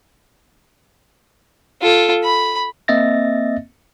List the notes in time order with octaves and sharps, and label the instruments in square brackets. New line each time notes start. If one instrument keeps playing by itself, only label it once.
[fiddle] F4 A4
B5
[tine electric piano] A#3 C4 D#5 E5 A6 A#6